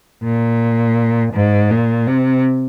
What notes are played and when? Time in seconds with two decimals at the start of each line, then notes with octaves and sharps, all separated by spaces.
0.23 A#2
1.34 G#2
1.70 A#2
2.07 C3